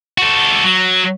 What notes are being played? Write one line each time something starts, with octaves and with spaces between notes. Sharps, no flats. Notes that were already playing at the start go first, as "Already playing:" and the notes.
F#4 A4
F#3